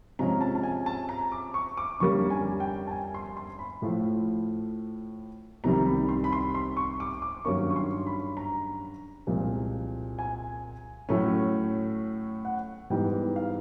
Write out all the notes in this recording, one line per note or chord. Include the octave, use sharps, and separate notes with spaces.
C3 F3 G#3 C#4 A#5
A5
A5
G#5
A5
A#5
D6
C#6
D6
F2 D3 G3 A#3 C#4 C#6
G#5
G5
A5
G#5
C6
C6
B5
A2 F3 A3
C2 C3 D#3 G3 A#5
B5
C6
B5
C6
C6
C#6
D6
D6
G2 D#3 F#3 A#3 C#4 C#6
C#6
C6
B5
A#5
C2 A#2 F3 G#3
G#5
A2 F#3 A3 C#4
F#5
G#2 E3 G3 B3 G5
F5